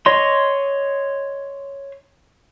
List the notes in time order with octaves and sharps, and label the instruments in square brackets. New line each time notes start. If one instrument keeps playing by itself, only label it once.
[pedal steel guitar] C#5 D#5 C6